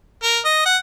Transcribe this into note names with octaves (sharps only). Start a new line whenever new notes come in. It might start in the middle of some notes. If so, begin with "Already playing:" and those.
A#4
D#5
F#5